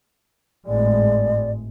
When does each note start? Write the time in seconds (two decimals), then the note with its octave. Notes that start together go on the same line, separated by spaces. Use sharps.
0.67 G#1 A2 G#3 D5